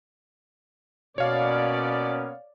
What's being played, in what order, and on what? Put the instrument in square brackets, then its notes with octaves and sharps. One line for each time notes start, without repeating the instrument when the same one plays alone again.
[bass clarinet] B2 [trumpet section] A#3 B3 C#4 [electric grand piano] C#5 F5 [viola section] D5